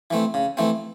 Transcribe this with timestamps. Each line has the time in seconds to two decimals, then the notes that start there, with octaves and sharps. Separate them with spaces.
0.11 E3 A3 C4
0.34 C#3
0.57 E3 A3 C4